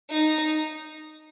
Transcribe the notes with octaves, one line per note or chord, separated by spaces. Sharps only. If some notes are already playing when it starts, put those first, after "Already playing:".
D#4